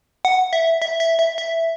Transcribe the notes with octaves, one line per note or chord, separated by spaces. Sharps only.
F#5
E5
E5
E5
E5
E5